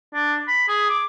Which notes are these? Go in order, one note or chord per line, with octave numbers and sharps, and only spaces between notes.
D4
B5
G#4
D6